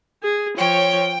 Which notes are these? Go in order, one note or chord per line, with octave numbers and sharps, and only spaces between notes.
G#4
F3 C#5 G5